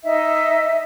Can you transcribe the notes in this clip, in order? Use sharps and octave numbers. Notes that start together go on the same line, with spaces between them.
D#4 D#5 E5